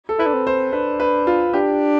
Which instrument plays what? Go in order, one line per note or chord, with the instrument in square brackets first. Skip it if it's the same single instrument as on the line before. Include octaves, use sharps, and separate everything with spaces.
[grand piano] A4
[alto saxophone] E4 [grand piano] B4
[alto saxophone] D4
C4
[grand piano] C5
[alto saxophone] D4 [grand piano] B4
[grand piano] B4
F4
[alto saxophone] D4 [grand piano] G4